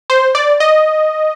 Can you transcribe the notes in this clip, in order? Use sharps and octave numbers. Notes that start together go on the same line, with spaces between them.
C5
D5
D#5